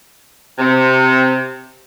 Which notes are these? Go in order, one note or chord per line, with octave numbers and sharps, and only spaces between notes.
C3